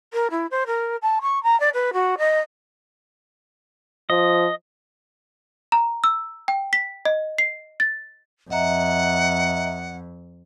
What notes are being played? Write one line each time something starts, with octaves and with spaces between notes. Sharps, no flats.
A#4
E4
C5
A#4
A5
C#6
A#5
D5
B4
F#4
D#5
F3 D#5
A#5
E6
G5
B6
D#5
C7
A6
F2 D#5 E5 F#5 A#5